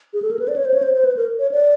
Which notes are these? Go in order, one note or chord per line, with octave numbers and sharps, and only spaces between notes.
G#4
A4
A#4
B4
D5
C#5
C5
C#5
C5
C5
B4
A#4
C#5
D5